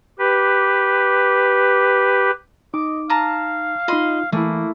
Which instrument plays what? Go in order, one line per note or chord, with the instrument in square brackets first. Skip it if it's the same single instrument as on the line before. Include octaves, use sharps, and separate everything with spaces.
[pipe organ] G4 B4
[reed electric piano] D#4 [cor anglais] D#5 [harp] D6
[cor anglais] F5 [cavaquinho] A5 A#5 D#6
[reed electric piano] D#4 F4 [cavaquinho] D#5 B5 C6
[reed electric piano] E3 [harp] A3 E4 [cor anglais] A#3 [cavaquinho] G#4